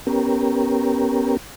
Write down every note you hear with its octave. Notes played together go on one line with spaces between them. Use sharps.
B3 C#4 G4 A#4